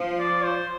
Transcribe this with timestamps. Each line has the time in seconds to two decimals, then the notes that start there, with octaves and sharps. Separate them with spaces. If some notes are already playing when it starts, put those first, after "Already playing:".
Already playing: F3
0.19 D5
0.44 C5